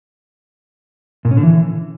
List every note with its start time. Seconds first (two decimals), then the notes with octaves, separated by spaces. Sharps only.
1.25 A#2
1.31 C#4
1.37 D3
1.43 E3